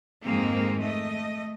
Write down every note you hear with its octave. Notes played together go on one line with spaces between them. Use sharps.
F2 G#2 D#3 G#3 A#3 C4
A3 D#5